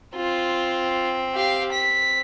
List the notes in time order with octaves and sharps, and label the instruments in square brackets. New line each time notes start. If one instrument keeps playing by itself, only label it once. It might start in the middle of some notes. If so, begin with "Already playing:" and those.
[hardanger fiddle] C4 [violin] F4
[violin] G4 F5
B6